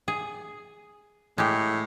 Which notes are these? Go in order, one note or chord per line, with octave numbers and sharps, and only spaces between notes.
G#4
A2 G#3 G4